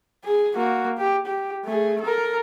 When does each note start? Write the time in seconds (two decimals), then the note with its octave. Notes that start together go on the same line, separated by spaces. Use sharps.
0.24 G#4
0.56 A#3 F#4
0.98 G4
1.26 G4
1.65 A3 G#4
2.01 A4 A#4